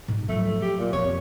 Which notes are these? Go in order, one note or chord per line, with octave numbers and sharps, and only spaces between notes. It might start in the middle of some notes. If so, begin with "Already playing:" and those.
G#2
F3 F#3 A3
G4
A#2
F2 C#5